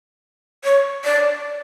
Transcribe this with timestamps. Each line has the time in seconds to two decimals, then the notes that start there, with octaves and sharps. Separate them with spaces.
0.64 C#5
1.05 D5